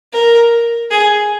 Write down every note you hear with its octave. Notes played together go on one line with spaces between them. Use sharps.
A#4
G#4